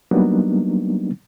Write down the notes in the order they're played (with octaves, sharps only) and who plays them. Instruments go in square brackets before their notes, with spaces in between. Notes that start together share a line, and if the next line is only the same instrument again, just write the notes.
[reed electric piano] F#3 G3 A#3 B3 D4 D#4